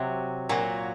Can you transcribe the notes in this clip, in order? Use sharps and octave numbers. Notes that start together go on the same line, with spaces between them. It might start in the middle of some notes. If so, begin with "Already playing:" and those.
Already playing: C3 F#3
A#2 F#3